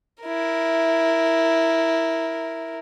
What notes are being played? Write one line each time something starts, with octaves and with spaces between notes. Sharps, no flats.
E4 A#4